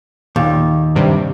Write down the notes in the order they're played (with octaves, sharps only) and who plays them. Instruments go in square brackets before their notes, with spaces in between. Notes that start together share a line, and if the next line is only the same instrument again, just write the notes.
[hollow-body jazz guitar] D#2 [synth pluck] A#2
[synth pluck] G2 C3 G3